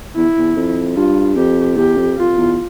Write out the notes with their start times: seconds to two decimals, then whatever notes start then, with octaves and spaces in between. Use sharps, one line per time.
0.16 E2 E4
0.38 E2
0.56 F2
0.97 G2 F4
1.37 F2 G4
1.77 E2 G4
1.97 F2
2.18 F2 F4
2.37 E2